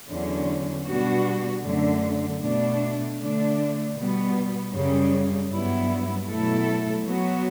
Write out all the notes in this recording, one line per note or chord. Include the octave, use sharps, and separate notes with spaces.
E2 D3 F#3 C#4
B2 G3 B3 D4 F#4
F#2 D3 A3
B2 A3 D4
D3 A3 D4
B2 G3 B3
F#2 C#3 G3
G2 F#3 B3 E4
B2 F#3 A3 E4 A4
F#3 B3 F#4